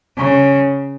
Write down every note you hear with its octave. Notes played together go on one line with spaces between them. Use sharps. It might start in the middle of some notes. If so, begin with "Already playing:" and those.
C#3